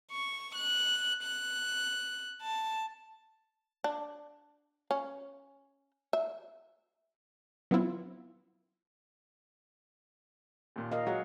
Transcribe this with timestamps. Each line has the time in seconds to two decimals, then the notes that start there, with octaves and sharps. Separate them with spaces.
0.12 C#6
0.55 F#6
1.23 F#6
2.42 A5
3.84 D4
4.91 C#4
6.13 E5
7.71 F#3 B3 C4 E4 F4
10.76 D#2 A#2
10.92 A#4 D#5 F5
11.07 F#3 G#4 F#5